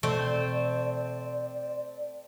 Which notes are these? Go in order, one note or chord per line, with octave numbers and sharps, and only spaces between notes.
B2 E3 A3 C4 D5